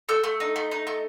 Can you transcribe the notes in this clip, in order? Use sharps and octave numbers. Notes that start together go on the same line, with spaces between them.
A4 E6 G6
A3
D#4
A3
D#4
A3